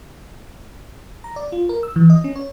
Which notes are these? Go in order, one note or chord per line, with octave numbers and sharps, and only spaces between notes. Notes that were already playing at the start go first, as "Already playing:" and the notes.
A#5
D5
F4
A#4
E6
E3
D#5
C#4
C#5